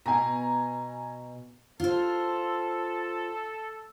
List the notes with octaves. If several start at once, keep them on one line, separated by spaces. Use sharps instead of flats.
B2 G#5 A#5
F4 A4 C5